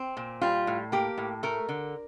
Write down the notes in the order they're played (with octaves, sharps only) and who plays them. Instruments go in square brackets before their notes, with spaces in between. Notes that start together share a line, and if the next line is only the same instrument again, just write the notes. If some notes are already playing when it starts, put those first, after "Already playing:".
Already playing: [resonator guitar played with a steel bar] C4
A#2
G3 F4
A2
A#3 G4
A2
A3 A#4
D3